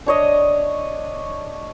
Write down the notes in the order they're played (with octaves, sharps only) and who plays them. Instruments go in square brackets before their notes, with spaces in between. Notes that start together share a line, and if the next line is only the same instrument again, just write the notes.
[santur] D4 C#5 D#5